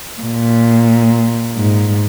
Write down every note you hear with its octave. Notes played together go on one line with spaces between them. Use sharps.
A#2
G#2